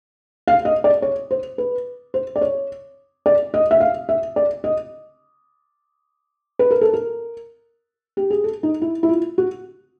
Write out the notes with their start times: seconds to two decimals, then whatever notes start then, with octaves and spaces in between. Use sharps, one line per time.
0.48 F5
0.65 D#5
0.84 D5
1.02 C#5
1.31 C5
1.58 B4
2.14 C5
2.36 D5
2.41 C#5
3.26 D5
3.54 D#5
3.71 E5
3.80 F5
4.09 E5
4.36 D5
4.64 D#5
6.59 B4
6.71 A#4
6.81 A4
6.93 A#4
8.17 G4
8.30 G#4
8.44 A4
8.63 D#4
8.82 E4
9.03 E4
9.09 F4
9.38 F#4